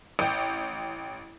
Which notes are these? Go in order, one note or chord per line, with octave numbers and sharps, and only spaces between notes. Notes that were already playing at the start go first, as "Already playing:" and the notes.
A1 G5